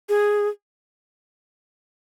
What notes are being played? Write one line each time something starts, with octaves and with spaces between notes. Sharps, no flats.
G#4